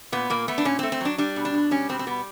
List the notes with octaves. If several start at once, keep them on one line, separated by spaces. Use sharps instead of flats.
A#2 B3
A#2 A#3
A3 B3
D4
A#2 C#4
C4
A3
C4
F#3 D4
G3 D4
B2
D4
B2
G3 C#4
B2 C4
C4
G3 B3